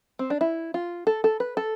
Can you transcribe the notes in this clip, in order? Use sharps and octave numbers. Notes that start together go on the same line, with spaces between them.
C4
D4
E4
F4
A4
A4
B4
A4